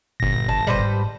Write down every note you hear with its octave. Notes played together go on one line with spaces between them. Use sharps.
G1 A#2 A#6
A5
A#2 G3 B4 C5
G#2